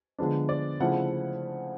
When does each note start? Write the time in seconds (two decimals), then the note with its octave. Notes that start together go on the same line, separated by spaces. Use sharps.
0.19 D3 F3 G#3 B3 D4
0.49 D5
0.80 C#3 F3 A3 C4 E4 F#5